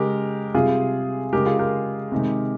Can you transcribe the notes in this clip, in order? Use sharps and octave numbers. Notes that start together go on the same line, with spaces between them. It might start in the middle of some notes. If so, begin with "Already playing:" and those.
Already playing: C#3 G#3 G4 A#4
C3 G3 F4 G#4
C#3 G#3 G4 A#4
F4 G#4
G4 A#4
C3 D#3 G#3